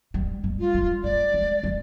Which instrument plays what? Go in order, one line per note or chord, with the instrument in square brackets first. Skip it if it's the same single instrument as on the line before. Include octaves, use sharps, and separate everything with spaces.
[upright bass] G3
G3
[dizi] F4
[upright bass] G3
[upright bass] G3 [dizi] D5
[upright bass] G#3
G3